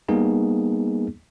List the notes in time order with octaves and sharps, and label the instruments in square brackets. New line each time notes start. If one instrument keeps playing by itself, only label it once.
[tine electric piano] G3 A#3 B3 D#4 G#4